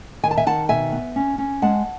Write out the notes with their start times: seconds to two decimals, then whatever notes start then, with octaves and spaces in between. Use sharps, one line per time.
0.23 D#3 G#5
0.31 A5
0.37 E5 G#5
0.46 D#3 F#5 A5
0.69 B2 E5 G#5
0.92 B3
1.16 C#4
1.38 C#4
1.62 G#3 F#5 A5